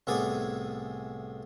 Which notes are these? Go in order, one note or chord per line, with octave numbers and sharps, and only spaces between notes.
C2 A2 B3 G#4 D5 G#5